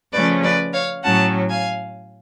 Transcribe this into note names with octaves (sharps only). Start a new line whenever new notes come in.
C#3 F3 A3 C#4 B4 D5
B4 D5
C#5 F5
A2 F#3 C#4 F#5 A5
F5 G#5